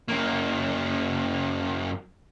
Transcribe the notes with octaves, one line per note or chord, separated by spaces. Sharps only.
F#2 A#3